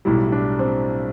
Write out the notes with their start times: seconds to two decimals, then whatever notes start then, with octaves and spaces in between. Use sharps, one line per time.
0.05 B1 A2 G3 E4
0.32 D4
0.59 C4